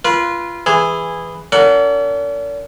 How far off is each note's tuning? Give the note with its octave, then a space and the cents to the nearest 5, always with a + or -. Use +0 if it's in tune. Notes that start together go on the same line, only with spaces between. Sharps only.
F4 -20 B4 -30
E3 +0 G#4 -10
D4 -45 A#4 -40 F#5 +0